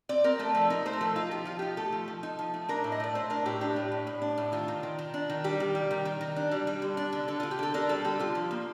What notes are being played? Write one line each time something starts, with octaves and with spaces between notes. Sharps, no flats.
C4 D5
C4 A#4
A3 A4
F3 A4
D#4 A#4
A3 C5
A#4
F3 A4
D#4 F4
F3 G4
F3 F4
D#4 G4
A3 A4
F3
F3
D#4
F3
A3
D4 A#4
A2
D#5
A3 D5
A3 C5
D4 A#4
A2 G4
D4 G4
A2
A2
A2
D4
A2
D#3 F4
D#3
D#3
D#3
D4
D#3
G3 G4
D#3
G3
D#3
D#3
D#3
D4
G3
G3
D3
D4
D3
D3 A4
D3 F4
G4
D3 A4
D4 A#4
G3 A4
D3 G4
D3 F4
F3
A#3